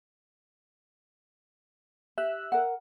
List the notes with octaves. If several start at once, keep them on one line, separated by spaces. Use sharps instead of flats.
G4 E5 E6 F#6
A#4 F#5